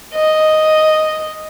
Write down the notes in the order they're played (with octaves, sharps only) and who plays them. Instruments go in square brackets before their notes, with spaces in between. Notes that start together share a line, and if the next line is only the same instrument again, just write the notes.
[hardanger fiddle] D#5